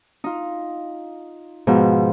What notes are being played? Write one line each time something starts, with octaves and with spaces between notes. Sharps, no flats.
D#4 F4
G#2 B2 F3